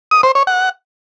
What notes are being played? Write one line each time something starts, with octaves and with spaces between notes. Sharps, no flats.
D#6
C5
C#5
F#5